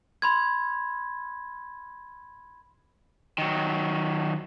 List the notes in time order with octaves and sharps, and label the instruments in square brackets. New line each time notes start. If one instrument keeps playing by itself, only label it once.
[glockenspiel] B5 C6 G#6
[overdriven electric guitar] D#3 F#3